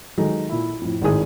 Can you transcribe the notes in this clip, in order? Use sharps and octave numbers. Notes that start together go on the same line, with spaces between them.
D#3 F#3 G#3 D#4 A4
A#2 E4
F2 A2
G#1 A2 D#3 G#4 D#6